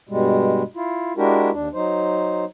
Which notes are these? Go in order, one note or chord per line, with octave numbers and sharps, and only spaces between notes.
G2 B2 G3 G#3
E4 F4
G#3 D4 E4 F#4 G4 A#4
D#2 D4
F#3 D#4 C5